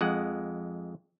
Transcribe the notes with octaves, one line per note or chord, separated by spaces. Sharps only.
F2 G#3 F#5